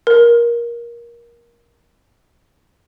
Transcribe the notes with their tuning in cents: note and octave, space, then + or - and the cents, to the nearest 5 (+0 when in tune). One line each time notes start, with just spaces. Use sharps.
A#4 +15